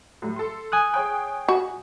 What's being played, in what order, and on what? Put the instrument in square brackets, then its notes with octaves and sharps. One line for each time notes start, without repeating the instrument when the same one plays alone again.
[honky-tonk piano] A2 F#3 G3
A4 C6
[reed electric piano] G#5 D#6 F#6
[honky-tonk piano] G#4 C#5 G5
[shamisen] F#4